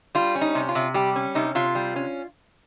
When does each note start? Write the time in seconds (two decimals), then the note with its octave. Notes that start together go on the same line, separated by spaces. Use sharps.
0.15 G3 F4
0.35 C#4
0.41 D#4
0.55 C3
0.69 F4
0.75 C3
0.94 G3 G4
1.16 C#4
1.35 C3 D#4
1.55 C3 F4
1.75 G3
1.96 C#4